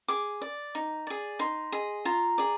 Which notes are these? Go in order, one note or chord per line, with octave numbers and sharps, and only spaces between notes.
G#4 D6
D5
D#4
G#4 D5
D#4 C6
G#4 D#5
F4 A#5
G#4 D5